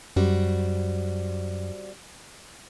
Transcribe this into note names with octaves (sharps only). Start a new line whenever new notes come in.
F#2 G3 F#4 C5